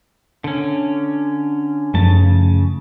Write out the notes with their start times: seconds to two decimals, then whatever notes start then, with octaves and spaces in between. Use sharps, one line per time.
0.44 D3 C#4
1.94 F#2 C#3 F3 A3 A5